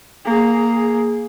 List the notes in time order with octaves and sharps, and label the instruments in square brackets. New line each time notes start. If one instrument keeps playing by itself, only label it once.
[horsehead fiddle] A#3 G#4